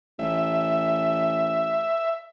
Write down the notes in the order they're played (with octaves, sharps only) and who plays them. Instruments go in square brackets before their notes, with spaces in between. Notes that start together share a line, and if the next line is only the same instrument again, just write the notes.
[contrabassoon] A1 [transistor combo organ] E5